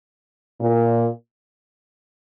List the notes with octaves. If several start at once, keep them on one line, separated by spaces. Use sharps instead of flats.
A#2